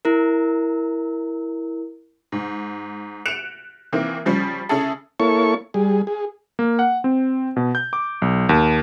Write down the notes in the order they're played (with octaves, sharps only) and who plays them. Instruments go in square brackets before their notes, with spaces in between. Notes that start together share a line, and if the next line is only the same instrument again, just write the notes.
[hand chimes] E4 A#4
[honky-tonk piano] G#2
F#6 C#7 D7 E7 F7
D#3 E3 A#3 C4
C#3 F3 G3 C#4
C#3 C#4 E4 G#4 A4
[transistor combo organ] A#3 E4 A4 C#5 C#6
G3 G#4
G#4
[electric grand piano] A#3
F#5
C4
B2
G6
D6
B1
D#2